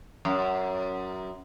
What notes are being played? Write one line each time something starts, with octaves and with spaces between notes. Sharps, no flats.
F#2